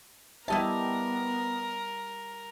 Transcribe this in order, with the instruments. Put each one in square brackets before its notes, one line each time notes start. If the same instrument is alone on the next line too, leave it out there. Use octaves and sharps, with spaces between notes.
[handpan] G3 G4 E5 [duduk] B3 [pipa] E4 D#5 A5 [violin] A#4